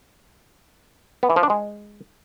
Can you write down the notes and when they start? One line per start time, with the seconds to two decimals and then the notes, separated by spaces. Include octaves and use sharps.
1.23 B3
1.30 E3
1.36 F3
1.43 D4
1.50 G#3